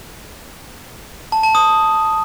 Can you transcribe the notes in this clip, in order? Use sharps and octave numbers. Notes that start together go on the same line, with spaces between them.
A5
A5
D#6